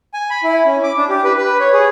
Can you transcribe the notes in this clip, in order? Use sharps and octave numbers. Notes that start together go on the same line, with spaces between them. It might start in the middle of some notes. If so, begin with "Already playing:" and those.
G#5
B5
E4
C#4
D6
D4
G4
B4
B4
C#5
G#4